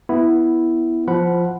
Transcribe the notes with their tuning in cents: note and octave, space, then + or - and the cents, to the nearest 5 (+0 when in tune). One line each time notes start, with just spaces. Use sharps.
B3 +0 E4 +0
F3 +0 F#5 +0 B5 +0